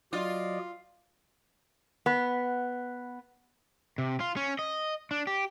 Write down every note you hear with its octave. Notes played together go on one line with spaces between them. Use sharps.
F#3 F4 D5 D#5
B3
C3
F4
C#4
D#5
D4
G4